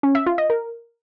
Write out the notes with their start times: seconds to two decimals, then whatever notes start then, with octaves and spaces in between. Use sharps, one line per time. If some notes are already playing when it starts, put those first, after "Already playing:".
0.03 C#4
0.15 E5
0.26 F4
0.38 D#5
0.50 A#4